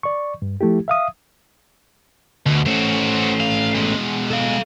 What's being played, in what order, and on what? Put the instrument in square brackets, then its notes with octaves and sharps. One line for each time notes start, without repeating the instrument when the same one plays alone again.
[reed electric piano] D5 C#6
G2
F3 A3 E4 G4
E5 F5 D#6
[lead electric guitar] D2 [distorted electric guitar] B2
[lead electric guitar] A3 C#4 [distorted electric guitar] F#4 C5
[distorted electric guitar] F5
B2 G#3
[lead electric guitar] A4 F5